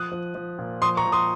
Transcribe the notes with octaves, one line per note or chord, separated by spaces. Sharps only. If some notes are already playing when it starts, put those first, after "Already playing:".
Already playing: F3 D#6 F#6
F3
F3
A#2
F3 C6 D#6
A#5 C#6
F3
C6 D#6